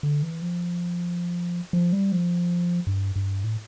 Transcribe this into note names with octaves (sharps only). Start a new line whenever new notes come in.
D3
E3
F3
F3
G3
F3
G2
G2
A2